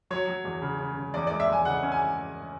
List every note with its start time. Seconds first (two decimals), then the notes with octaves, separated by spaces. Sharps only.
0.11 F#3 C#5
0.27 F#3
0.45 E2
0.62 C#3
0.79 C#3
0.97 C#3
1.14 E2 D5
1.27 G#3 D5
1.40 E5
1.48 E2 G#5
1.65 C#3 F#5
1.83 C#4
1.92 G#5